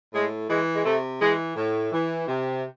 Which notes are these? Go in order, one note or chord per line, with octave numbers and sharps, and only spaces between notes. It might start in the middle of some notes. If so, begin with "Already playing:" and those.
A2 G#3
E3 G#3
G#3
C3 A3
E3 G#3
A2
E3
C3